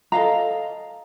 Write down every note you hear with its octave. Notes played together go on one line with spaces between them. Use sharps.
A4 D#5 F5 A#5